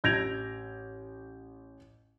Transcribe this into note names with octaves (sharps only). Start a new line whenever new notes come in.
A1 G6 G#6 A#6 D7 F7